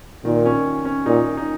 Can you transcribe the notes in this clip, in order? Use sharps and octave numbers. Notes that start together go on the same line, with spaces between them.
A#2 D#3
C#4
C#4
A#2 D#4
D#4